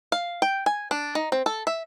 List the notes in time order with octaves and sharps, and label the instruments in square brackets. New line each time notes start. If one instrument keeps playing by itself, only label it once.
[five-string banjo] F5
G5
G#5
D4
D#4
C4
A4
E5